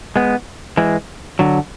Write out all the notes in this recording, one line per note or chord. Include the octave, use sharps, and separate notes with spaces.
G#3 B3
E3 G#3
D3 F#3